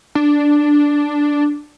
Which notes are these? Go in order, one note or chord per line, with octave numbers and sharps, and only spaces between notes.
D4